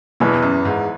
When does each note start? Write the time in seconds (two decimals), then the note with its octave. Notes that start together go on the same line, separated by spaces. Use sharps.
0.20 E2 B2 E3 B3
0.42 F#2
0.65 G#2